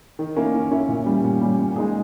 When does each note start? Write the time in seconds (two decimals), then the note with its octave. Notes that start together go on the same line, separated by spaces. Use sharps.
0.19 D#3
0.36 A#3 C#4 E4
0.54 D#3
0.71 A#3 C#4 E4
0.89 A#2
1.06 G3 C#4
1.24 A#2
1.41 G3 C#4
1.59 A#2
1.76 G#3 D#4 G#4